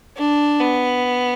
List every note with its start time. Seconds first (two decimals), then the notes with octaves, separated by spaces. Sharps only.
0.17 D4
0.60 B3